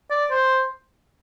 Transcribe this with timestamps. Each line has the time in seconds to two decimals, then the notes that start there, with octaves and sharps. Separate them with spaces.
0.11 D5
0.31 C5